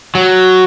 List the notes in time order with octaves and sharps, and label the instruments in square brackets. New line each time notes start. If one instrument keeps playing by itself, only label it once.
[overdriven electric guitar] F#3